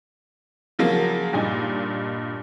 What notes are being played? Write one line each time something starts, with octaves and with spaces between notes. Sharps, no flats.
C#3 F3 F#3 A#3
G2 A#2 D#4